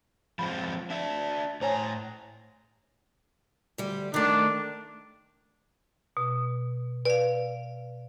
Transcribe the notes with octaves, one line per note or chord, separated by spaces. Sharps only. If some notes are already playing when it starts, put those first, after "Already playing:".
F3 G#3 C4 B5
D4 E5
A2 C5 C#5 G#5 A#5
D2 G3
D#3 A3 D4
B2
B4 D5 F5